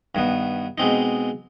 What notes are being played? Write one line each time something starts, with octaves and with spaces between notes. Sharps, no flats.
G2 D#3 B3
B2 G#3 C4 D#4